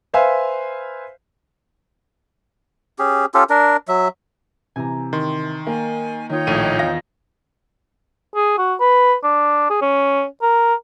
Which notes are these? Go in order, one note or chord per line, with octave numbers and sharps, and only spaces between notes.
B4 C5 E5 F5 G#5
C#4 G4 G#4
C#4 F4 G4 A4
D4 A#4
F#3 E5
C3 E3 G#5 A#5
D#3 C6
A#3 G#5
D#3 D#4 F4 C#5 G5
A#1 A2 D#7
E2 F5 A#6
G#4
F#4
B4
D4
G#4
C#4
A#4